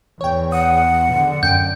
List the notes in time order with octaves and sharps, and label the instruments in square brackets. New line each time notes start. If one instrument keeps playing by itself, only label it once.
[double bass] E2 [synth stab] C#5 G5
[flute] F#5 [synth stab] D#6
[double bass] D3
[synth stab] F#2 G5 D7 [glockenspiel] G6